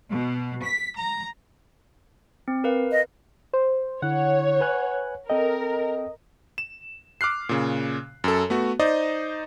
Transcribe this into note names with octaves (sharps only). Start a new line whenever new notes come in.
B2
B6
A#5
C4
A#4 B4 F5
D#5
C5
D3 E4 C#5 F#5
B4 G#5 F#6
C4 A4 A#4 D#5 G5
E7
D6 F6 F#6 C7
A#2 C#3
F#2 A4
A3 B3 F#4
D#4 C5 D5 D#5